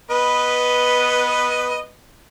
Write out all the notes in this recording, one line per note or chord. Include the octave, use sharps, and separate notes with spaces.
B3 B4 D#5